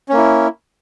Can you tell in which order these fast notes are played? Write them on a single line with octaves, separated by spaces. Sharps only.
C#4 A#3 E4